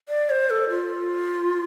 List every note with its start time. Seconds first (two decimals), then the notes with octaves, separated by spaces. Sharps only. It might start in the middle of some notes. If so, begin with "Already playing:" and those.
0.09 D5
0.30 C5
0.50 A4
0.69 F4